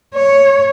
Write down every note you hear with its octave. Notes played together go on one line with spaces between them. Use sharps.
C#5